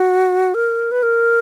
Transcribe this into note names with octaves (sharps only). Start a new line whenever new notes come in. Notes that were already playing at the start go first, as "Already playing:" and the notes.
Already playing: F#4
A#4
B4
A#4